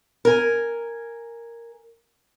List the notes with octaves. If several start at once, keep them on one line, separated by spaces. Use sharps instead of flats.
A#4 G#5